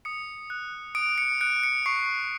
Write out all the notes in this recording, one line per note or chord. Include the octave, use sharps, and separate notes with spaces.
D#6 C#7
F#6
D#6 D7
C#7
F#6 D7
C#7
C#6 C7